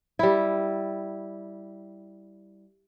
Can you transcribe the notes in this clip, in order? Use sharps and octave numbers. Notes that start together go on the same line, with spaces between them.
G3 E4